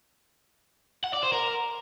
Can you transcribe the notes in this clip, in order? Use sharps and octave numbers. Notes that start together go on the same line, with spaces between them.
F#5
D5
C5
A#4